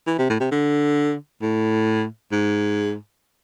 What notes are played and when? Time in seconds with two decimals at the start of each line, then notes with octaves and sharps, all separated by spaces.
0.06 E3
0.18 C3
0.30 A2
0.40 C3
0.51 D3
1.42 A2
2.32 G#2